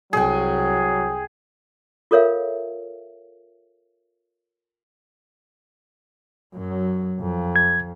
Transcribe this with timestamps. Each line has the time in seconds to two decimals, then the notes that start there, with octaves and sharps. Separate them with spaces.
0.13 C2 F#3 G#4 G5
2.11 F4 A4 A#4 C#5 E5 F5
6.54 F#2 F#3
7.20 F2
7.56 G#6